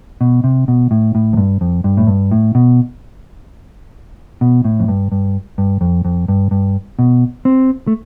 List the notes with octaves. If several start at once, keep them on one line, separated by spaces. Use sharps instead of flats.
B2
C3
B2
A2
A2
F2
G2
F2
G2
A2
G2
A2
B2
B2
A2
F2
G2
G2
G2
F2
F2
G2
G2
B2
C4
A3